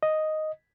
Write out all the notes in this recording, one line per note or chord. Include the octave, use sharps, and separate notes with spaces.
D#5